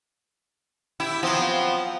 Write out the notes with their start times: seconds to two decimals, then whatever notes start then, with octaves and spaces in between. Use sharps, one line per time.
1.00 E4 G4
1.23 F3 F#3 B3 C4